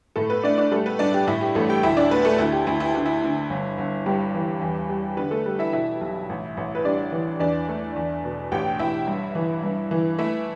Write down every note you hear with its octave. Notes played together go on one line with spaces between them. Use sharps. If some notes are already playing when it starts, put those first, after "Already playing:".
A2 A3 A4
B3 B4
A3 D4 D5
D4 D5
G3 A3 A4
B3 B4
G2 D4 D5
G4
A2 E4
G4
A1 A3 A4
G4 G5
D2 E4 E5
D4 D5
A3 B3 B4
A3 A4
D2 E4
G4
D2 E4
E4
D3
E4
D3
G1
G1
G2 G4
E3
E2
G3
D3 B3 B4
A3 A4
G3
E4 E5
B2 E4 E5
B1
A1
A1
B4
G3 D4 D5
E3
E2 D4 D5
A3
E2
B2
A1 G4 G5
A1 E4 E5
G2
E3
G2
E3
A3 E4 E5